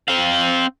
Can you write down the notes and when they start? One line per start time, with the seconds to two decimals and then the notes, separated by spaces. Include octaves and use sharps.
0.08 C4 F5